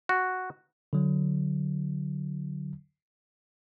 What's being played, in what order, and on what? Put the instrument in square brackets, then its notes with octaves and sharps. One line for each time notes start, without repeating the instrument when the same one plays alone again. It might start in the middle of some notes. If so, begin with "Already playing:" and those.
[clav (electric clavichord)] F#4
[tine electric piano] D3 F#3